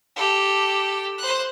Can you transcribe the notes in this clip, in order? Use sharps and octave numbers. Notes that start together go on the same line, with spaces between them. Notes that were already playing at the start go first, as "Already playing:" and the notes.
G4 A4
C5 F#6